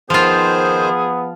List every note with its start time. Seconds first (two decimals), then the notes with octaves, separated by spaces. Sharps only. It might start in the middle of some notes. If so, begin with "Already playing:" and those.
0.10 D#3 F3 B3 F4 G#4 C5